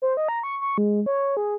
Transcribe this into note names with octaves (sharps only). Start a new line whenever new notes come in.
C5
D#5
A#5
C#6
C#6
G#3
C#5
G#4